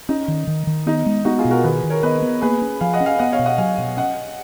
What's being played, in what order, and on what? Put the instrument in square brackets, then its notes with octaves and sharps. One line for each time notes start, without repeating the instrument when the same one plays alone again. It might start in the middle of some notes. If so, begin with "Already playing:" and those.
[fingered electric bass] C#4 [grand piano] D#4
[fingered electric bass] D#3
D#3
D#3
[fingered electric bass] B3 [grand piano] D#4
[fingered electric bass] G#3
[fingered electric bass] B3 [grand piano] D#4 F#4
[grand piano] F4 G#4
[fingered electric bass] B2
[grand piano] F#4 A#4
[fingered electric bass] D#3 [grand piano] G#4 B4
[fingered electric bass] D#3
[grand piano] A#4 C#5
[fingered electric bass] B3 [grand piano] B4 D#5
[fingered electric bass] B3
[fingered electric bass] A#3 [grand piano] G#4 B4
[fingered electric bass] C#4
[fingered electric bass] F3 [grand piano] F5 G#5
[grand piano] D#5 F#5
[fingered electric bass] C#4
[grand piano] F5 G#5
[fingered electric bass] B3 [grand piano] D#5 F#5
[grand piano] C#5 F5
[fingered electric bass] B2
[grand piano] D#5 F#5
[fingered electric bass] F#3 [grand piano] F5 G#5
[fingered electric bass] B2
[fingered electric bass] C#4 [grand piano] D#5 F#5